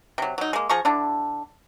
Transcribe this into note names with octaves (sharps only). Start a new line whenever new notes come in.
C3 F#3
F#3 D#4
G#3 A#3
F3 G#4 A#5 C#6
D3 D4 E4